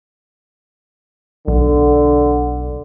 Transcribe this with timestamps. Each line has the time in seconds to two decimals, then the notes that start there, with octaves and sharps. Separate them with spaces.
1.48 B1 D3